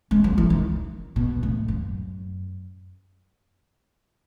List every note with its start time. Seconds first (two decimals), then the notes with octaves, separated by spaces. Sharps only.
0.11 G#3
0.24 F#3
0.38 E3
0.50 D#3
1.16 B2
1.43 A2
1.68 F#2